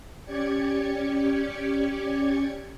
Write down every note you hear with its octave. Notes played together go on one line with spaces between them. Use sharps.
C#4 G4 D5 G#6 C#7